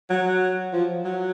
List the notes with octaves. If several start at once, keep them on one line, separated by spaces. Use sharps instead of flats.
F#3
F3
F#3